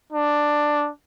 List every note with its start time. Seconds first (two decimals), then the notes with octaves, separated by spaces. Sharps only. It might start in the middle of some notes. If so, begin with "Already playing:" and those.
0.12 D4